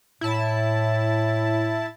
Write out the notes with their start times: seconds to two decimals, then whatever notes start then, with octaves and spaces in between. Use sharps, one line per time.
0.21 A2 E4 A5